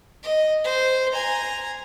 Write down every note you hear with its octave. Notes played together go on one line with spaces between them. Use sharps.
D#5
C5
G#5 A#5